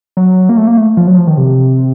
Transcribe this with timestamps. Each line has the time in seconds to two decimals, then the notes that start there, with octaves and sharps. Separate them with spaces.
0.17 F#3
0.49 A#3
0.57 A3
0.67 A#3
0.77 A3
0.97 F3
1.07 F#3
1.17 F3
1.27 D#3
1.38 C3